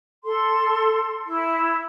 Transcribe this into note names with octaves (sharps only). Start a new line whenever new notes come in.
A4 C6
E4